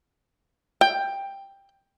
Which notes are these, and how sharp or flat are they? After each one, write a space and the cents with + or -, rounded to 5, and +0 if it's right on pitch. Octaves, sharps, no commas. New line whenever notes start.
G5 +10